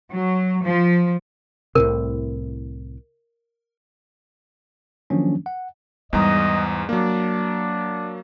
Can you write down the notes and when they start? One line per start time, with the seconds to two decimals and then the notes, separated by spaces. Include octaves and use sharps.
0.11 F#3
0.64 F3
1.75 C2 A2 C3 A#4
5.10 D#3 F3 F#3 A#3 C#4 D4
5.46 F#5
6.13 E2 G#2 G3 D#5 A#5
6.89 F#3 A#3 D4